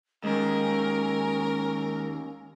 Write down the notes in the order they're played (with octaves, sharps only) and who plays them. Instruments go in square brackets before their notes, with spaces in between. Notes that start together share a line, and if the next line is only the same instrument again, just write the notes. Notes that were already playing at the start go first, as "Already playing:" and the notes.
[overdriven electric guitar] D#2 [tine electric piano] G#3 [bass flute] C#4 [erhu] A#4